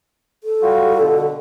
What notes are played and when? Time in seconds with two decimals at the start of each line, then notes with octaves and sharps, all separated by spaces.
0.44 A4
0.62 G3 F4 F#4
0.99 B2 D3